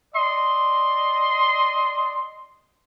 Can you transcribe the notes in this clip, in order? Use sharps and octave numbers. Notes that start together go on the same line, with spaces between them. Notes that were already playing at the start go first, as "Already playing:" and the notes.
D5 D#5 C6